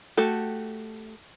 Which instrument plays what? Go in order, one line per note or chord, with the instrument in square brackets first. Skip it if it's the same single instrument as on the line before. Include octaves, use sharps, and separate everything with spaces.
[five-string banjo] A3 F#4 G4 A4